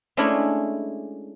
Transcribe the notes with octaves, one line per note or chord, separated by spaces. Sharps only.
G#3 A3 C#4 D4 E4